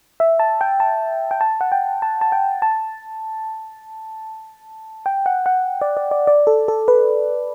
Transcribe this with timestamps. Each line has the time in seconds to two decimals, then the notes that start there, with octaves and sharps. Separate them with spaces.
0.20 E5
0.39 A5
0.61 G5
0.80 A5
1.31 G5
1.41 A5
1.61 F#5
1.72 G5
2.02 A5
2.21 A5
2.32 G5
2.62 A5
5.06 G5
5.26 F#5
5.46 F#5
5.82 D5
5.97 D5
6.11 D5
6.27 D5
6.47 A4
6.68 A4
6.88 B4